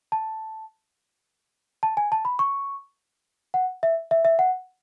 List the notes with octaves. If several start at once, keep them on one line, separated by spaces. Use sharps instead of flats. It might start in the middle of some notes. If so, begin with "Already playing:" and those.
A5
A5
G#5
A5
B5
C#6
F#5
E5
E5
E5
F#5